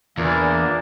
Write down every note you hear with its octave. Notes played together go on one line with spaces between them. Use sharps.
E2 A#2 E3 A#3 D4